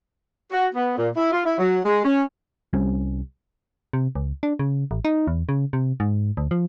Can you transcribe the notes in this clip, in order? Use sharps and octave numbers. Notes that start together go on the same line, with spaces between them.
F#4
B3
A#2
E4
F4
E4
F#3
G#3
C#4
C2 G3 C4 C#4
C3
C#2
D4
C#3
A1
D#4
E2
C#3
C3
G#2
D2
F3